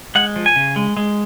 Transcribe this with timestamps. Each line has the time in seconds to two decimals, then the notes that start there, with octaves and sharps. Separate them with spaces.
0.15 G#3 F#5
0.36 F3
0.46 G#5
0.56 C#3
0.76 G#3
0.97 G#3